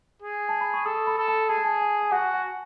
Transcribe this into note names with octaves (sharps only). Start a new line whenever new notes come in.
G#4
A5
B5
C#6
A4 D#6
B5
A4
A5
G#4 A5
G#5
A5
G#5
G#5
F#4 F#5
F#5